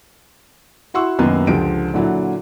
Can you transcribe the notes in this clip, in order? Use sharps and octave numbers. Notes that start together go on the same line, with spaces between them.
E4 F#4 F#5 C6 C#6 E6
F#2 C3 D#3 A#3 B3
C#2 D3 F3 G4 D7
A#2 D3 F#3 E4